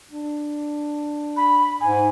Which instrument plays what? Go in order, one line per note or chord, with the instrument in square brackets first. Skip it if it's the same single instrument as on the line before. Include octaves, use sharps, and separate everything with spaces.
[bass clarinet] D4
[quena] B5
[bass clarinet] G#2 [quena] G#5